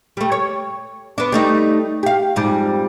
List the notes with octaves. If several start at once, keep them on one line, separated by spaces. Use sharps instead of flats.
G3 A3
C#5
B3 D4
G3 A3 D#4
G4 F5
F2 G#2 G3